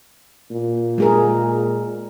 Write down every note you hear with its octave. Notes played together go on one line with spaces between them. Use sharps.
A#2
G#3 G#4 A#4